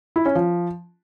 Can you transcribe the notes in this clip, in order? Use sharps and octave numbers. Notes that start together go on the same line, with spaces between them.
E4
C#4
F3